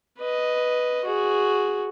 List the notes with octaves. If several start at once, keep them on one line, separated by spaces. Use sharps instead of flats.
B4 D#5
F#4 G#4